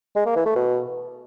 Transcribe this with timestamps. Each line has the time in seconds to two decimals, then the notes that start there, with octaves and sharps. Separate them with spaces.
0.16 G#3
0.26 A#3
0.36 E3
0.46 A3
0.55 B2